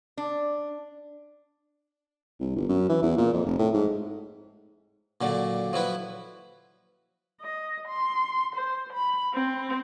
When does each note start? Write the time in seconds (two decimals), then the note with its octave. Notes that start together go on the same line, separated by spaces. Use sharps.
0.17 D4
2.40 C2
2.56 G1
2.69 F#2
2.89 E3
3.03 E2
3.17 A#2
3.33 F2
3.46 F1
3.59 A2
3.74 G#2
5.21 A#2 D3 F#3
5.73 F3 F#3 E4 B4
7.41 D#5
7.88 C6
8.56 C5
8.93 B5
9.34 C4